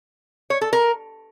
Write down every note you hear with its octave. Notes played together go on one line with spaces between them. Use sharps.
C#5
A4
A#4